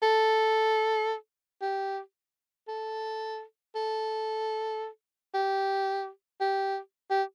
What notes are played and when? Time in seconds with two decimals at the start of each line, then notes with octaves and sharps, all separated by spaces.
0.03 A4
1.62 G4
2.68 A4
3.75 A4
5.34 G4
6.41 G4
7.11 G4